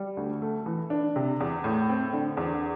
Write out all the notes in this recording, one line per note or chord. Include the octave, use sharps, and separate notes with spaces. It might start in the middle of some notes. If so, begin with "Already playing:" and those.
Already playing: G3
D2
A3
E3
D4
C3
E2
A2
C4
D3
E2